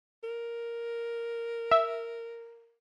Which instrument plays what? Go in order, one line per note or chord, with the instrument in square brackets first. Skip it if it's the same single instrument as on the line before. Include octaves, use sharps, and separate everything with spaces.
[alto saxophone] A#4
[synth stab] E5